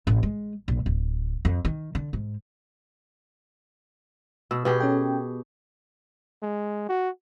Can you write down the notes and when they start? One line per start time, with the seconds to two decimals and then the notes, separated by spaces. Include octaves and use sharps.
0.07 A1
0.23 G#3
0.68 A#1
0.86 D1
1.45 F2
1.65 D#3
1.95 D3
2.13 G#2
4.51 B2 E6
4.65 B2 G4 G#4 B4
4.80 C#4 A4 G5
6.42 G#3
6.89 F#4